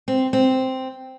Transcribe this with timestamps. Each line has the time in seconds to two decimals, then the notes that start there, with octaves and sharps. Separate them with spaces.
0.08 C4
0.33 C4